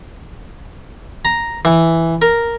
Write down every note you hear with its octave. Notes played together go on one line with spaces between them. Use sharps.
A#5
E3
A#4